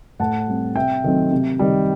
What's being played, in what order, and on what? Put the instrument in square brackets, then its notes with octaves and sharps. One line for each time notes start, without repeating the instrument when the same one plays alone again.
[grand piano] A2 F#5 A5
G3 C4
C3 E5 G5
D#3 F#3 A3 C4
C3
D#3 G3